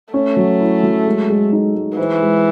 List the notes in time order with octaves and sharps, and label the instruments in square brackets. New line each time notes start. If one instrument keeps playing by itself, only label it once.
[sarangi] A3 [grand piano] C#4
[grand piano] F#3
E4
F#3
G#3
G#3
D#4
G#3
[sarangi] E3 [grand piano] C5
[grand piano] G#3